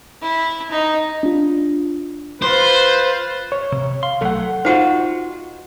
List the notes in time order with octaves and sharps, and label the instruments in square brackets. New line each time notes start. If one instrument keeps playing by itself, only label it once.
[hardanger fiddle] E4
D#4
[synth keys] D4 F4
[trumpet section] F4 B4 [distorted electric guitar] C5
[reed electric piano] C#5
[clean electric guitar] C3
[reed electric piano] F5 [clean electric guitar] C6
[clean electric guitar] B1 F#3 A3 [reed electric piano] A4 F#5
[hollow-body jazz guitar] D#4 F4 F#4 [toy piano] C5 F#5